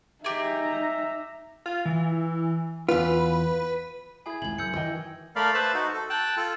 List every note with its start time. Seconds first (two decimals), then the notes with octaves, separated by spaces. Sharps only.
0.24 D#4 G4 G#4 E5 A#5
1.66 F4
1.85 E3
2.89 E2 F4 B4
4.26 E4 G#4 G#5 B5 G#6
4.42 G#1 C#2 G#6 F#7
4.58 F#2 E6 G6 C#7
4.75 D#3 E3 E4 D#5 G5
5.36 A3 A#4 D5 F5 B5
5.54 B4 C5 E5 A5 B5
5.74 D#4 F#4
5.93 A4
6.10 G5 A5 F#6
6.37 F4 A4